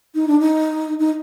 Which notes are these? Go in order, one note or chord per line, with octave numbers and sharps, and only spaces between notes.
D#4
D4
D#4
D#4